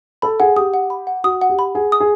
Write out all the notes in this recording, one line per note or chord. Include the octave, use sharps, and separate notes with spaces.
A4 B5
G#4 F#5
G4 D#6
F#5
B5
F#5
F#4 D#6
F#5
G4
B5
G#4 F#5
D#6
G#4